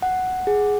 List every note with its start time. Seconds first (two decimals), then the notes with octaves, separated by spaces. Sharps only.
0.02 F#5
0.47 G#4